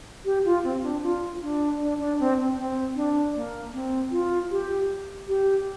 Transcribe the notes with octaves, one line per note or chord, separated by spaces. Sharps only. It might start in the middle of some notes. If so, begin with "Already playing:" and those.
G4
F4
C4
D4
F4
D4
D4
D4
C4
C4
C4
D4
A#3
C4
F4
G4
G4